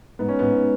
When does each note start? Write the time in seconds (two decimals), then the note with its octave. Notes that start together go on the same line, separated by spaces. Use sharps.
0.19 G#2 B3
0.28 C#4
0.39 G#2 B3